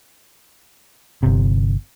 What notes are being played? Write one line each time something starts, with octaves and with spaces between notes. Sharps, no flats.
G1 C3